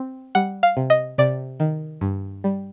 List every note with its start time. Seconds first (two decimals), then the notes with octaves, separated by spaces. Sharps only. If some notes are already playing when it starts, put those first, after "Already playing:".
Already playing: C4
0.35 G3 F#5
0.63 F5
0.77 C3
0.90 D#5
1.18 C3 D5
1.60 D#3
2.01 G2
2.44 G3